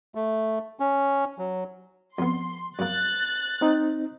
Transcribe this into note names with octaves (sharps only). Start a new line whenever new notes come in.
A3
C#4
F#3
F2 B3 C6
F#2 A#3 F#6 A6
C4 D#4